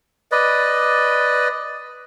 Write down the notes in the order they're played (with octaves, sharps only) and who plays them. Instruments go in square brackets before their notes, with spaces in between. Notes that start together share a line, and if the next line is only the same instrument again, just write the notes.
[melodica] B4 D5 D#5